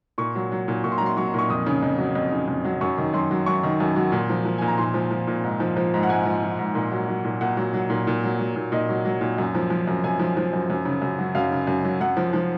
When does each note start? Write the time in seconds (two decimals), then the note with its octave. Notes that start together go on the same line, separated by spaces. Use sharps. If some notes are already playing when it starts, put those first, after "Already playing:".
0.18 A#2 C#6
0.35 F#3
0.52 F#3
0.68 A#2
0.84 A#2 C#6
0.92 C6
0.98 F#3 A#5
1.06 C6
1.17 F#3 C#6
1.34 A#2 C#6
1.50 F2 D#6
1.66 C#3
1.83 F2
1.98 F#3
2.15 F2
2.32 C#3
2.48 F2
2.65 F#3
2.81 F#2 C#6
2.98 D#3
3.14 F#2 C6
3.31 F#3
3.46 F#2 C#6
3.63 D#3
3.80 F#2
3.96 F#3
4.12 A#2
4.30 F3
4.45 F3
4.58 A#2 G#5
4.68 A#5
4.78 A#2 C6
4.94 F3
5.11 F3
5.27 A#2
5.44 G#2
5.60 F3
5.77 F3
5.94 G#2
6.03 F#5
6.09 G#2 G#5
6.25 F3
6.43 F3
6.59 G#2
6.75 A#2
6.92 F#3
7.09 F#3
7.25 A#2
7.41 A#2 F#5
7.57 F#3
7.74 F#3
7.90 A#2
8.07 A#2
8.24 F#3
8.39 F#3
8.56 A#2
8.72 A#2 D#5
8.89 F#3
9.05 F#3
9.21 A#2
9.38 F#2
9.55 F3
9.70 F3
9.87 F#2
10.04 F#2 G#5
10.20 F3
10.37 F3
10.53 F#2
10.70 F#2
10.85 C#3
11.02 F#2
11.19 F#3
11.35 F#2 F5
11.51 C#3
11.67 F#2
11.84 F#3
12.01 F#2 F#5
12.17 F3
12.33 F3